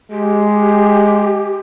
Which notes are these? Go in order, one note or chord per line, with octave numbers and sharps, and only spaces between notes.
G#3 G4